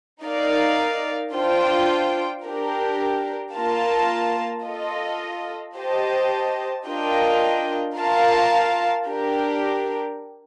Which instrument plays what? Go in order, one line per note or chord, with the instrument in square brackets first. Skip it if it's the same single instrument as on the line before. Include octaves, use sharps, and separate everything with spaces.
[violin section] D#4 A#4 D5 F5
D4 F4 C5 G5
D4 G4 A#4
A#3 F4 A#4 F5 A5
F4 A4 D#5
G4 C5 D#5 A5
D4 F4 A#4 D#5 G5
F4 A#4 F5 A5
D4 G4 A#4